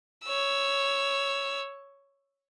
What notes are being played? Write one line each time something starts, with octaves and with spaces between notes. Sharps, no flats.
C#5 E6